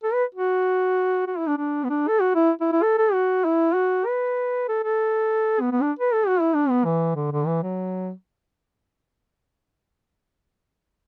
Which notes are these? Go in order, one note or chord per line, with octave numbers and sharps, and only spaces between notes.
A4
B4
F#4
F#4
E4
D4
D4
B3
D4
A4
F#4
E4
E4
E4
A4
A4
F#4
E4
F#4
B4
A4
A4
B3
B3
D4
B4
A4
F#4
E4
D4
B3
E3
D3
D3
E3
F#3